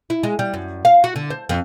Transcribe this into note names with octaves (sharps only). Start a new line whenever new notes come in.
E4
G#3
G3
F#2
F5
F#4
D3
C5
F2